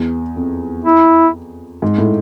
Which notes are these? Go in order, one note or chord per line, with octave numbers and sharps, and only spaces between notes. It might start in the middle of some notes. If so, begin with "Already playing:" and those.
Already playing: E2
F2
E4
G#2
A2